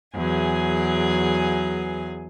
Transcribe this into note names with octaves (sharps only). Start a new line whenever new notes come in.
E2 F#3 G#4 G#5